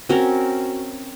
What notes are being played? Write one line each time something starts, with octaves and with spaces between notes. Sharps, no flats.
C4 C#4 F#4 A#4